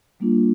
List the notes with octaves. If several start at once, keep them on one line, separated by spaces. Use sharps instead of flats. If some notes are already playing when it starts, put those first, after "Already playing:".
G3 A#3 D4 F4